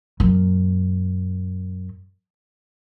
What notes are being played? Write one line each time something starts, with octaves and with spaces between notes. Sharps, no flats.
F#2 A#2